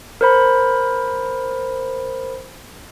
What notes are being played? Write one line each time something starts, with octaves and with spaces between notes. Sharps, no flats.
A#4 C5 B5